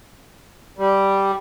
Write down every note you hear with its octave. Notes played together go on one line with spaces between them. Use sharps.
G3